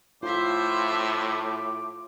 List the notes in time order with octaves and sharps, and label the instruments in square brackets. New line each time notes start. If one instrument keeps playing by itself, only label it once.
[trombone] A2 [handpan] F4 [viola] C5 E5 [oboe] D6